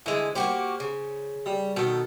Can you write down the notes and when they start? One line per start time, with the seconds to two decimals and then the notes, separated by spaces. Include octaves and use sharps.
0.06 D3 E3 G#3
0.35 A#3 F#4 G4 C5 C#6
0.80 C#3
1.46 G3
1.76 B2 D#3 A4